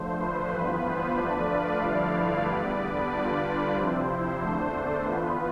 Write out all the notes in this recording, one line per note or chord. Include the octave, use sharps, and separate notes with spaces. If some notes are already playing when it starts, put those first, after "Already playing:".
Already playing: D3 F3 A3 C5
B4
G2 E3 B3 F4 B4
C5
D3 F3 A3 D4 B4 D5
D5 F5
G2 D3 F3 A3 E4 D5 F5
B4 D5
E2 D3 G3 B3
D3 G3 D4 F4 B4 D5
C3 F3 C4 E4 C5
E2 D3 A3 D4 C5
C5
E3 B3 F4 B4